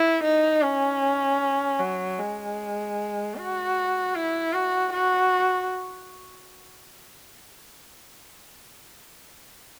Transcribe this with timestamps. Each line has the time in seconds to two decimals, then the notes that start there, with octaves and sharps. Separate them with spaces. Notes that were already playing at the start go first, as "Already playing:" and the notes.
Already playing: E4
0.24 D#4
0.62 C#4
1.80 F#3
2.19 G#3
3.36 F#4
4.15 E4
4.53 F#4
4.93 F#4